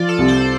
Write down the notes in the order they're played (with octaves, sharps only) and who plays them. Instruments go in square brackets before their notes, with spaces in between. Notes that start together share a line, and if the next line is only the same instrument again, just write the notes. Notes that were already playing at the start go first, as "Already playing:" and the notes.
Already playing: [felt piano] F3 [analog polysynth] F4 D5
[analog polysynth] A4
[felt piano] C2
[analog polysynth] C5